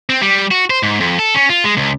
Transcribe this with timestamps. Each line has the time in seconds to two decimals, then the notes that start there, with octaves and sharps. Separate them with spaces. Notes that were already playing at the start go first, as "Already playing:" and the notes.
0.10 C4
0.22 G3
0.51 F#4
0.70 C5
0.83 G#2
1.00 F2
1.19 A4
1.34 C#4
1.49 F4
1.64 G#3
1.77 C#2